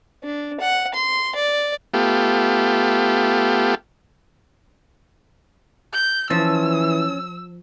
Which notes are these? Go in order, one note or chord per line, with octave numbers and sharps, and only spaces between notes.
D4
F#5
C6
D5
A3 B3 F4 G4
G6
E3 F3 C#4 A5 E6